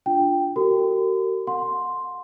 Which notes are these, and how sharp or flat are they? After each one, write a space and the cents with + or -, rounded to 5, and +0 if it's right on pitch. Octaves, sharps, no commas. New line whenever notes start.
D4 +0 F4 +0 G5 +0
F#4 +45 A#4 -40 C6 -45
F#5 -35 C6 +0